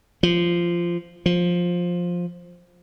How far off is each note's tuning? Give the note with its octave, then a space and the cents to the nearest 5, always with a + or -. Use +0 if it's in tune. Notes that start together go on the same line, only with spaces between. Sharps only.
F3 -15
F3 +10